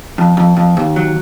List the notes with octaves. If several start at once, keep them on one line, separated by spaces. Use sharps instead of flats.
F2
F2
F2
D#2
F#3